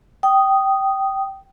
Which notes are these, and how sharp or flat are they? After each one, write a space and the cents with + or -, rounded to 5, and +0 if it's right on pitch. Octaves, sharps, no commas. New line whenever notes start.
G5 -15 D#6 +0